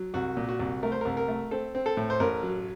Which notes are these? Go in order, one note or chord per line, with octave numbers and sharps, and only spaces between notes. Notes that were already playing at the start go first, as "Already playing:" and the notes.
Already playing: F#3
C2 F#4
A#2
F#4
C2
A3 A#4
C5
C2 A#4
A#4
A3
C4 A4
C4
A4
A2
C5
A1 A#4
F#3